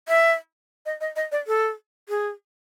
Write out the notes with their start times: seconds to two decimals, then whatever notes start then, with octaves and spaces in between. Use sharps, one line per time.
0.08 E5
0.86 D#5
1.01 D#5
1.16 D#5
1.32 D5
1.47 A4
2.09 G#4